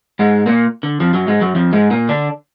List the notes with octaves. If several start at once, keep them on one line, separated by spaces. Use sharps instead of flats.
G#2 G#3
A#2 A#3
D3
F2 F3
F#2 F#3
G#2 G#3
F#2 F#3
F2 F3
G#2 G#3
A#2 A#3
D3 D4